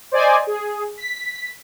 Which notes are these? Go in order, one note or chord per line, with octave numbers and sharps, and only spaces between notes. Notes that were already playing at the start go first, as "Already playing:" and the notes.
C5 D5 D#5 G#5
G#4
B6